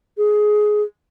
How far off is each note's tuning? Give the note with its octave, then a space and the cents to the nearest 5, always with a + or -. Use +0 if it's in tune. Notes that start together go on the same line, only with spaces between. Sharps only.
G#4 +15